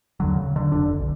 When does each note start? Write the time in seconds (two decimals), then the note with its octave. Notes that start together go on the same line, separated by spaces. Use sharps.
0.20 D#2 D3 F#3
0.35 C#3
0.56 D3
0.72 F1 D3 D4
0.99 B1